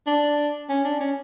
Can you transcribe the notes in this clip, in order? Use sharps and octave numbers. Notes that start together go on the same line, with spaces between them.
D4
C#4
D4
C#4